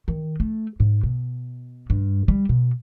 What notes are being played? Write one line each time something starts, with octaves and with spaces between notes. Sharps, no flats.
D#3
A3
G#2
B2
G2
G3
B2